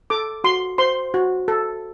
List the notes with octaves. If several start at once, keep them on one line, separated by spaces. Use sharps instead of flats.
A4 D6
F#4 C6
C5 C6
F#4
A4